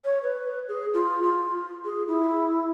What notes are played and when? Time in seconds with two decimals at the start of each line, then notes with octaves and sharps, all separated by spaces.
0.05 C#5
0.23 B4
0.68 G#4
0.94 F4
1.23 F4
1.85 G#4
2.08 E4